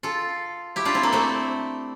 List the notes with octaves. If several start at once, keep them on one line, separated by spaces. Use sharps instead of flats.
F4 A4
E4 G4
D4 F4
C4 E4
A#3 D4
A3 C4